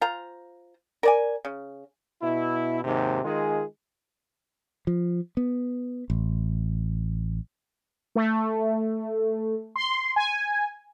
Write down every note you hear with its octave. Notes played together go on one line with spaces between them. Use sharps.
F4 C5 A#5
A#4 D5 G#5
C#3
B2 E4
D#2 G#2 C3
D#3 G#3 F4 G#4
F3
B3
A1
A3
C6
G#5